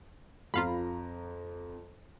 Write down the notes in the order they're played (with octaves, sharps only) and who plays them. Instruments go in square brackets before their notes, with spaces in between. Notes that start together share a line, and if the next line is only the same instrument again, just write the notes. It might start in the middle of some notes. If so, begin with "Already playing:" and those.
[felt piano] F2 A#5 [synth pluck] F4 F5 B5